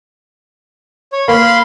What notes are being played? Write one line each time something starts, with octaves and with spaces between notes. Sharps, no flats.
C#5
A#3 F5 B5 C6